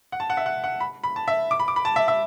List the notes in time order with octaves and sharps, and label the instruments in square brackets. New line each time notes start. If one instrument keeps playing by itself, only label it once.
[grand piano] F#5
A5
F#5
E5
F#5
F#5
B5
B5
A5
E5
D6
B5
D6
B5
A5
E5
E5